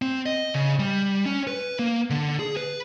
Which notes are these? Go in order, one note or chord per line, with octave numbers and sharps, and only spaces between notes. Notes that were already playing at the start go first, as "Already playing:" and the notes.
C4
D#5
C#3
G3
C#4
B4
A#3
D3
G#4
B4